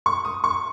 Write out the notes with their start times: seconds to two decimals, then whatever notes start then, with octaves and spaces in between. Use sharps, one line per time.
0.06 C#6
0.25 D#6
0.44 C#6